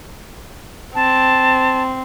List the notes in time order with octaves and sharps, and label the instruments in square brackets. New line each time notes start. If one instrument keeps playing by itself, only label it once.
[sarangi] C4 [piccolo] A5